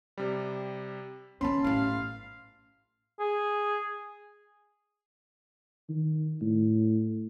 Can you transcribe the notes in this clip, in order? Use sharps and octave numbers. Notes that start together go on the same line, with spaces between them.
C3 G3
D#3 B3 C#4 A5 B5 C6
A1 E4 F5
G#4
D#3
A2